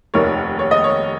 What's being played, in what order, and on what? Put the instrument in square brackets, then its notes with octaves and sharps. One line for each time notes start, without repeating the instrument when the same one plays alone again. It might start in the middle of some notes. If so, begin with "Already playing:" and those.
[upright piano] F1 D#2 D#3 C#5
C#5
D#5
C#5